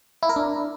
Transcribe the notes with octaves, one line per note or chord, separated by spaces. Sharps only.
E4
A#4
D4